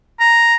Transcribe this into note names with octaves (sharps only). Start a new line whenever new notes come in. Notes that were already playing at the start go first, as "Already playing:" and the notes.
A#5